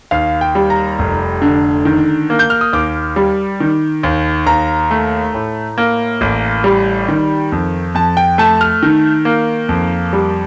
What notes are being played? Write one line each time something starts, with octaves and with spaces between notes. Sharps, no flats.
D#2 F5
G5
G3
A#5
F1
D3
D#3
A#3
G6
F6
D#6
D#2 D6
G3
D#3
D#2
D#2 A#5
A3
A2
A#3
A1
G3
D#3
F2
F2 A5
G5
A3 A5
F6
D#3
A#3
F2
G3